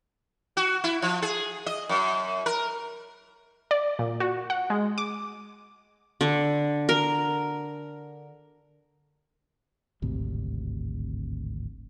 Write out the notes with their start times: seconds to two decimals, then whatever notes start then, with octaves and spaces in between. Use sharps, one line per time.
0.57 F#4
0.84 E4
1.02 F3
1.22 G#4
1.66 D#5
1.89 F#2
2.46 A#4
3.71 D5
3.99 A#2
4.20 F#4
4.50 F#5
4.70 G#3
4.98 D6
6.21 D3
6.89 A#4
10.02 D1 G#1 D2 C3